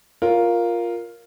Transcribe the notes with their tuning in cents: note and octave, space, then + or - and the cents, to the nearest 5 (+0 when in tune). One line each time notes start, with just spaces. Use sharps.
F4 +0 A#4 +5 C#5 +0